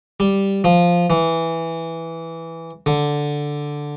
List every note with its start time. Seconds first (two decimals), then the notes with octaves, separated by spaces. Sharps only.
0.20 G3
0.64 F3
1.10 E3
2.86 D3